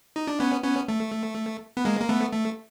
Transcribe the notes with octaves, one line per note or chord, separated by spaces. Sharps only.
D#4
D4
B3 C#4
B3 C#4
A3
B3
G#3 A#3
A#3
A3 B3
A3